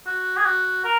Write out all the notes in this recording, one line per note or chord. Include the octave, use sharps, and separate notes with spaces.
F#4
G#4
F#4
A#4